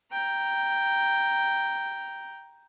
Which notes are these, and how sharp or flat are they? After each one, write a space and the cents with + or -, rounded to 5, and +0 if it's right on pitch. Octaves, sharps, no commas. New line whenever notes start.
G5 +0 A#5 +0